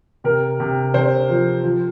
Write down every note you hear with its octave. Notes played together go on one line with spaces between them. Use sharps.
C3 A#4
C3
C3 C5
F3
F3